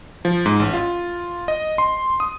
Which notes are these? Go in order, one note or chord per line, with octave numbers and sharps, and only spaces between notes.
F3
G#2
A1
F4
D#5
C6
D#6